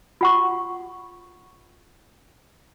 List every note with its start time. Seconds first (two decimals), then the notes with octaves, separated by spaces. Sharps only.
0.21 F4 F#5 C#6